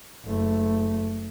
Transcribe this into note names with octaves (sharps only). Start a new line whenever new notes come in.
F#1 A3